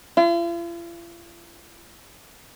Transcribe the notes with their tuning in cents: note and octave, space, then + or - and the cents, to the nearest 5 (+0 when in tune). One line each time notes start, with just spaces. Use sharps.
F4 -45